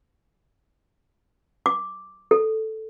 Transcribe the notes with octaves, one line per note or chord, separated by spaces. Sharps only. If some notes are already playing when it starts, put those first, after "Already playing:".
D6
A4